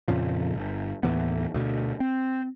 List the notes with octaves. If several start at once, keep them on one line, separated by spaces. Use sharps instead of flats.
F2 A#2 C#3 F3
G1
D#2 A2 E3 B3
D2 B2
C4